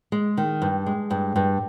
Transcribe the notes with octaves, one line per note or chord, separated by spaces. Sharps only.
G#3
D#3
G2
G#3
G2
G2